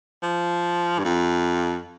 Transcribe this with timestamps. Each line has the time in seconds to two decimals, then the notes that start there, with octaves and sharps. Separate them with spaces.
0.23 F3
0.99 G2
1.05 F2